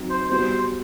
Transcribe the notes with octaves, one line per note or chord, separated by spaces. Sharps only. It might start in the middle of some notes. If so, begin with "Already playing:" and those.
Already playing: F#3 C4 D#4
C5
G3 B3 F#4 C5